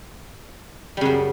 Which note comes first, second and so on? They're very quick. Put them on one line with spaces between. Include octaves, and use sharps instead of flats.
G3 C#3 F#2